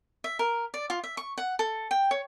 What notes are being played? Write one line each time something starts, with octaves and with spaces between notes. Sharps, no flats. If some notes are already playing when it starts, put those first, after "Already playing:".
E5
A#4
D5
F4
E5
C#6
F#5
A4
G5
C#5